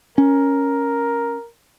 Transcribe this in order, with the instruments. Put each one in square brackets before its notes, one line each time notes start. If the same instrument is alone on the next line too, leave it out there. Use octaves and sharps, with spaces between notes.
[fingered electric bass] C#4 [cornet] A#4